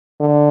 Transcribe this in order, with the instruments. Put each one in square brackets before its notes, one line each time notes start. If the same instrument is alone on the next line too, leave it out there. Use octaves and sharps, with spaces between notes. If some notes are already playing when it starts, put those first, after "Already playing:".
[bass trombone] D3